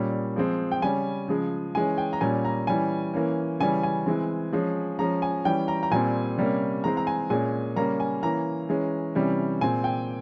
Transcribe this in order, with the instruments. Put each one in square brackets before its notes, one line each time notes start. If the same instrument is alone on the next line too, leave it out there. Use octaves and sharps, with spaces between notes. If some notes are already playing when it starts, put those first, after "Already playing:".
Already playing: [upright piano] A#2 G3 C#4
F3 G#3 C4
G5
C#3 G3 C#4 G#5
C#3 F3 G#3
E3 G#3 C#4 G#5
G5
A#5
A#2 G3 C#4 G#5
A#5
E3 G3 C#4 G#5
E3 A#3 C#4
C#3 E3 G3 C#4 G#5
G#5
E3 G#3 C4
F3 G#3 C#4
F3 G#3 C#4 A#5
G#5
E3 G3 C#4 G5
A#5
A#5
A#2 G3 C4 G#5
C3 G3 A#3 C#4
E3 G#3 C4 A#5
A#5
G#5
A#2 G#3 C#4 G#5
C#3 G3 A#3 C#4 A#5
G#5
E3 A#3 C#4 A#5
E3 G#3 C#4
C3 E3 G3 C#4
A#2 G#3 C4 G#5
G5